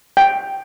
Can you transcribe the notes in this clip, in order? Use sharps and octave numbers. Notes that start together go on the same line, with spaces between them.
G5